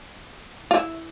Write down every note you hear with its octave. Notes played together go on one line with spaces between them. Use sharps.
F4
E4